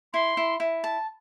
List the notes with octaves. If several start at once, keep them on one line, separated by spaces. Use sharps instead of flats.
E4 C6
E4
E4
A5